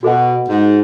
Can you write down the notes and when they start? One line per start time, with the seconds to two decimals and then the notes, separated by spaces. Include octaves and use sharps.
0.03 B2 F#4 A4 D#5 F#5
0.49 G#2